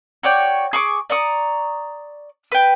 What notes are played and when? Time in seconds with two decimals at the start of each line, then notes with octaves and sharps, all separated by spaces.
0.23 F#4 C#5 D5 G5
0.73 G#4 C#6 D6
1.10 D5 A#5 C#6 D#6
2.52 B4 G5